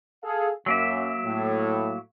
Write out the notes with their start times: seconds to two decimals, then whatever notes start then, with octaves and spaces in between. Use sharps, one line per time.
0.23 G#4 A4 F5
0.66 F#2 F#3 A#3 E5
1.25 A2